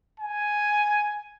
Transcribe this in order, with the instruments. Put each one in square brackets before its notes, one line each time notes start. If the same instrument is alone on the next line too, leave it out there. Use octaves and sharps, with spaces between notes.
[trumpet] G#5